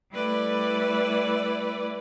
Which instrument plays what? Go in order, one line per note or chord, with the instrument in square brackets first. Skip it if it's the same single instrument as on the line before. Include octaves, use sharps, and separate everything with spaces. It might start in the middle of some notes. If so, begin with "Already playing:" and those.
[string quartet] G3 A3 E4 B4 D5